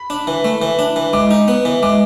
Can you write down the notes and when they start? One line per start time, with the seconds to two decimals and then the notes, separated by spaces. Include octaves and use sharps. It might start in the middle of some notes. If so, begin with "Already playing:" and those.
Already playing: B5
0.10 D4
0.27 E3
0.45 A3
0.62 E3
0.79 D4
0.96 E3
1.13 G#3 D6
1.31 D#4
1.48 B3
1.65 E3
1.83 G#3 D6